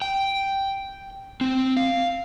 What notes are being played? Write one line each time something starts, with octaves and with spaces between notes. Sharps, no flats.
G5
C4
F5